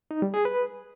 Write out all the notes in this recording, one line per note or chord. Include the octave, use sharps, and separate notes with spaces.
D#4
G3
G#4
B4